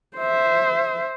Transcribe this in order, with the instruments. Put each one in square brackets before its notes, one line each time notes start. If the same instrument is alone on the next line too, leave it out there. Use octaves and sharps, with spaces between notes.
[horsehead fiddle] C5 E5